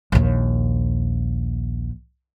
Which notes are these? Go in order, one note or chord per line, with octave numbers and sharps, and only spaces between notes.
A#1 D#2